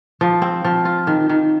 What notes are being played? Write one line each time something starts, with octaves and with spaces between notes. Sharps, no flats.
F3
C4
F3
F4
D#3
D#3